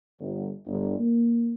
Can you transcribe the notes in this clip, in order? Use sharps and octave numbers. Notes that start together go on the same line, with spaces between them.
G1
G1
A#3